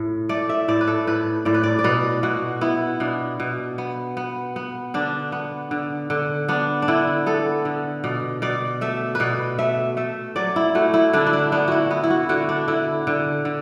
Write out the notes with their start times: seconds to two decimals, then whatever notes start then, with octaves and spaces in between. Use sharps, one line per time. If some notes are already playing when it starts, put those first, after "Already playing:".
Already playing: A2
0.29 A3 D5
0.49 E5
0.68 A2 D5
0.81 B4
0.87 A4
1.07 A2 B4
1.45 A2 D5
1.54 B4
1.63 D5
1.79 D5
1.84 B2 B4
2.23 B2 F#4
2.61 B3 E4
3.00 B2 D4
3.40 B2
3.78 B3
4.17 B3
4.56 B3
4.94 D3 D4
5.32 B3
5.71 D3
6.10 D3
6.49 B3 D4
6.82 D4
6.88 D3 E4
7.26 B3 A4
7.65 D3
8.04 B2 D5
8.42 B2 D5
8.81 A3 E5
9.15 B4
9.20 B2 D5
9.58 A3 E5
9.97 A3 E5
10.36 F#3 D5
10.56 E4
10.75 A3 F#4
10.94 E4
11.13 D3 D4
11.27 E4
11.33 D4
11.52 B3 D4
11.68 E4 F#4
11.91 B3 E4
12.03 E4
12.10 F#4
12.29 D3 F#4
12.49 D4
12.68 D3 E4
13.07 D3
13.45 D3